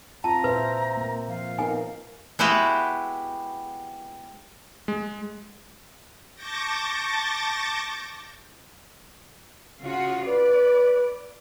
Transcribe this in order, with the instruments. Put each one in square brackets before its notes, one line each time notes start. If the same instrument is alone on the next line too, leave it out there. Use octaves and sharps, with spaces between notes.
[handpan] C4 F4 [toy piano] A5 [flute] A#5
[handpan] A#2 C5 E5 [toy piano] B4
[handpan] A#3
[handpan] F3 [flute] F5
[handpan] B3 D#4 A#4 [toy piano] G#5
[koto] G#3 B3 E4 F#4 G4 B4
[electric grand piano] G#3
[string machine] A5 C#6 D6 G6 A6 A#6
[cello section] C#3 F4 F#4
[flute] B4 [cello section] D5